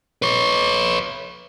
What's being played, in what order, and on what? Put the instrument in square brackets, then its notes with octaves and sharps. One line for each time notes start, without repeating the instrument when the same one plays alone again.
[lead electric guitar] B4 C#5